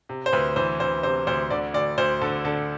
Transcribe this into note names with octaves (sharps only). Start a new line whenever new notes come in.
C3
C5
D2 B4
E3 C5
D2 C5
C3 C5
D2 C5
D3 D5
D2 D5
D2 C5
D3 A4
D3 A4